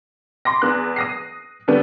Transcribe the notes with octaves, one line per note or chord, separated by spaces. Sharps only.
B5 C6 D6 A#6
E2 B3 F#6
D#6 A#6 C7
D3 G3 B3